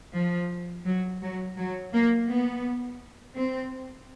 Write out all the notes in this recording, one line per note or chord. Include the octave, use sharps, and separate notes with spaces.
F3
F#3
F#3
F#3
A#3
B3
C4